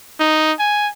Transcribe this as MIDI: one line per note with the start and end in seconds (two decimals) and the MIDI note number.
0.20 0.53 63
0.59 0.89 80